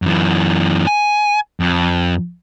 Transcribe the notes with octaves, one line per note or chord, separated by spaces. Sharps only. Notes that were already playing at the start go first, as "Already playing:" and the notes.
F#2 E3
G#5
F2